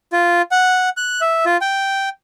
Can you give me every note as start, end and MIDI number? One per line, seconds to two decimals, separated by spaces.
0.13 0.42 65
0.51 0.89 78
0.97 1.21 90
1.21 1.45 76
1.46 1.57 65
1.61 2.09 79